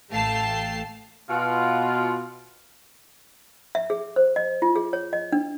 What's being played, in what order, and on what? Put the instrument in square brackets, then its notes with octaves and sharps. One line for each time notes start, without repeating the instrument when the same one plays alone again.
[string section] A1 A3 F5 G5 A5 C7
[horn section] B2 F4
[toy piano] E5
G#4
C5
D#5
F4
G#4
C#5
D#5
D4